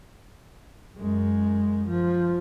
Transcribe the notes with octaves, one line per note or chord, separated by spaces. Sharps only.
F#2 G#3
F3